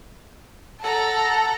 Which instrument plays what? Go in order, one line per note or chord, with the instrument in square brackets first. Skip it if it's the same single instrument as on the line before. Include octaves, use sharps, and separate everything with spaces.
[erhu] A4 [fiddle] F#5 A#5